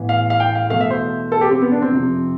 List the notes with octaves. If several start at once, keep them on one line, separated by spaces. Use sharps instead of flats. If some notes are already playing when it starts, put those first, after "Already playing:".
Already playing: A1 A2 E3 B3
F5
F5
G5
F5
E2 B2 A3 F5
E5
C5
A4
G4
C4
B3
D4
C4
F2 C3 F3